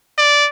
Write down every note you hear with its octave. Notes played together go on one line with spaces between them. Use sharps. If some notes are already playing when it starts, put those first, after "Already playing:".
D5